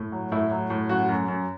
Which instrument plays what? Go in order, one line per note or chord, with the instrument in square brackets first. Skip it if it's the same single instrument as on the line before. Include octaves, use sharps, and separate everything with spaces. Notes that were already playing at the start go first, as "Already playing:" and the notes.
Already playing: [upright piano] A2
F#3
A2 E4
F#3
A2
F#2 F#4
F#2
F#2